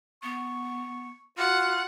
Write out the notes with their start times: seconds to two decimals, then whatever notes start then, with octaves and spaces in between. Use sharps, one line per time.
0.23 B3 C#6
1.38 F4 F#4 F#5